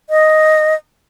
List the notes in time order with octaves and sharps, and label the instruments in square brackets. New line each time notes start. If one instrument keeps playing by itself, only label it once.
[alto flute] D#5